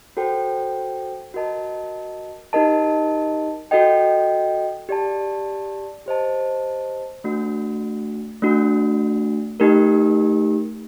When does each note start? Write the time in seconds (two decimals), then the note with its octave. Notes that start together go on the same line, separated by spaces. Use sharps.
0.17 F#4 A4 C5 G5
1.34 F#4 A#4 D#5 A5
2.53 D#4 G4 A#4 D#5 A5
3.71 F#4 A4 D#5 G5
4.89 G4 D5 A5
6.06 G4 C5 D#5 A5
7.24 A3 D4 F#4
8.42 A3 D4 F#4
9.60 A3 D#4 G4 A#4